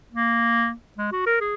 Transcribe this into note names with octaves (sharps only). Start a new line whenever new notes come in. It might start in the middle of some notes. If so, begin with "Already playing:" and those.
A#3
G#3
F#4
A#4
G#4